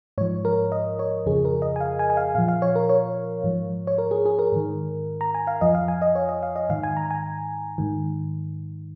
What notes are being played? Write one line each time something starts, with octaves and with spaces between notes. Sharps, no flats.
G#2 F3 C#5
A#4
D#5
C#5
F2 C#3 F3 G#4
A#4
D#5
G#5
F5
G#5
G#5
F5
A#2 F3 F5
F5
C#5
A#4
C#5
G#2 F3
C#5
A#4
G#4
G#4
A#4
G#2 D#3
A#5
G#5
F5
F2 F3 D#5
F5
G#5
D#5
C#5
D#5
F5
D#5
G#2 D#3 F5
G#5
A#5
G#5
G#2 D#3